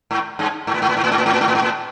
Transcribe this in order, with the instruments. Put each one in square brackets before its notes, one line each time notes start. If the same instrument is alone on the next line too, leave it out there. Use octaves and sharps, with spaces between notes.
[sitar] G#2
G2
G#2
A2
G#2
A2
G#2
A2
G#2
A2
G#2
A2
G#2
A2
G#2
A2